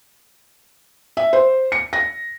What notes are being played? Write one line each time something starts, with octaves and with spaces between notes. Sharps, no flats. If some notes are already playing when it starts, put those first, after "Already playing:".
E5
C5
C#7
A#6